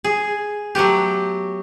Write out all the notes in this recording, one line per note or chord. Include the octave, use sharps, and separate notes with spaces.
G#4
F#3 A3 B3 G4